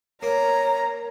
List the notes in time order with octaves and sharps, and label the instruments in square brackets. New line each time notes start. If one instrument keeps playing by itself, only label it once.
[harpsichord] A#3 [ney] C#5 [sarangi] A#5